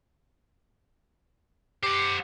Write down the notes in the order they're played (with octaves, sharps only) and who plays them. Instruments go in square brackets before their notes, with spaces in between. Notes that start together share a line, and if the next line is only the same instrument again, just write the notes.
[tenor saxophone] G4 [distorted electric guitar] C5 F#5